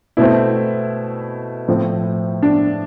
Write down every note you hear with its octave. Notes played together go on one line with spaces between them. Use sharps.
B2 A3 C4 E4
A2 F3 C4
D4